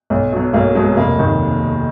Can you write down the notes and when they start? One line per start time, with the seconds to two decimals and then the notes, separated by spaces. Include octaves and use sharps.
0.10 B1
0.32 B2 F#3
0.53 B1 A#3
0.75 B2 F#3 G#3
0.97 F1 A#3
1.18 D#2 D#3